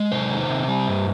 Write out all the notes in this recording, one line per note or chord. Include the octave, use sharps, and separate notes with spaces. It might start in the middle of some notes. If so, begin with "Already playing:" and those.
Already playing: G#3
C3 C5
D#3
C3
G3
G2